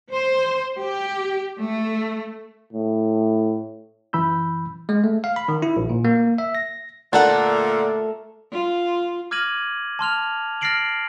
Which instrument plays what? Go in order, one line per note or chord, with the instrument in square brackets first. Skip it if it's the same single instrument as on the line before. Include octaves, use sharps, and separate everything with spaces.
[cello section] C5
G4
A3
[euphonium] A2
[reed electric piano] F#2 E3 B5 E6 G6
[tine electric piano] G#3
A3
F5
B5
D#3
E4
A#1
A#2
A#3
E5
A#6
[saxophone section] A#2 D3 [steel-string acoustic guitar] A3 A4 A#4 [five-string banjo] D4 F#5
[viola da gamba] F4
[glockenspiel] D6 F6 G#6 A#6 D#7 F#7
A5 C6 F6 F7
F6 A6 A#6 C7 D7 F#7